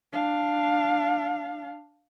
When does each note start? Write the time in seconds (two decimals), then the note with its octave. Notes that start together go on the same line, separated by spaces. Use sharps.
0.13 D4 F5